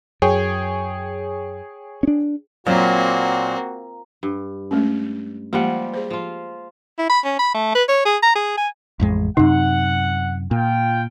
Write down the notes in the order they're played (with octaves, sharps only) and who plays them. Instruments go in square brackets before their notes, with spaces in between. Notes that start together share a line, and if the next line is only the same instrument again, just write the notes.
[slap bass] F#2 [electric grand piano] G#4 C#5 G5
[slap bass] C#4 D4
[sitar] A#2 [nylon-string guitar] F#3 F4 F#5 [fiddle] A#3 C4 [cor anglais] F#4
[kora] G2
[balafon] G#3 A3 C#4
[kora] F3 G3 F#5 [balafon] G#3 A#3
[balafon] G#4 C5
[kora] F3 F4
[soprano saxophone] E4
B5
C#4
B5
A3
B4
C#5
G#4
A#5
G#4
G#5
[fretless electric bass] A1 F2 G#3
[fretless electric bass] F#2 C3 [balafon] D#4 [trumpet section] F#5
[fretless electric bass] A#2 [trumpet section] F4 G5